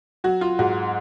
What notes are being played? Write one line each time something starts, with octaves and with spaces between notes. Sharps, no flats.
F#3 F#4
F4
G#2 F#4